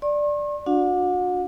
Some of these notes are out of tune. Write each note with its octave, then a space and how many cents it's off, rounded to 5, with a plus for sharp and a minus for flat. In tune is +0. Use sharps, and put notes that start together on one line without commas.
D5 +0 C#6 -45
D4 +0 F#4 -35 F#5 -40